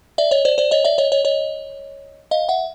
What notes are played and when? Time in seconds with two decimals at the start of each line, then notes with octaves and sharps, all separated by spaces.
0.18 D5 E5
0.31 C#5 D#5
0.45 C5 D5
0.58 C5 D5
0.71 C#5 D#5
0.84 D5 E5
0.98 C#5 D#5
1.12 C#5 D#5
1.25 C#5 D#5
2.31 D#5 F5
2.49 E5 F#5